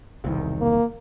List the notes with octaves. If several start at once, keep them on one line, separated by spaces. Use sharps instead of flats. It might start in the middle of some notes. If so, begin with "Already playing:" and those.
E1 C2 D#3
A#3